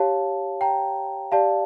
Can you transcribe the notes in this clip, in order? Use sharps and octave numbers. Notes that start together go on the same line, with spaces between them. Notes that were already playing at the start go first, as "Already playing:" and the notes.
Already playing: G4 C#5 F5 A5
G5 A#5
G4 D5 F5 A5